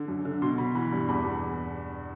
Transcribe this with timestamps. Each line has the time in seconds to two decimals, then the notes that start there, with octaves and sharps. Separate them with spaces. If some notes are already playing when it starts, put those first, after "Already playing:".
Already playing: D3
0.08 F#2
0.25 D3
0.42 B2 C6
0.58 B2 B5
0.75 E3 B5
0.92 G2
1.09 E2 B5
1.26 E2